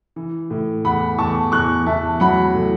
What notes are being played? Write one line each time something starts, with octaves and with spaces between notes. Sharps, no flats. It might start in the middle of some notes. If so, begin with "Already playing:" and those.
E3
A2
E2 F#5 B5
E2 A5 C#6
E2 C#6 F#6
E2 E5 A5
F#3 F#5 B5
A2